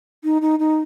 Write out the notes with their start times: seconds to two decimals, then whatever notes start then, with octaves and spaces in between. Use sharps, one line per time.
0.24 D#4
0.42 D#4
0.59 D#4